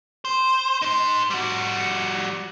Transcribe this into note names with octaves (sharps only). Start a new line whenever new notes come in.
C5
D#4 C5
G3 F#4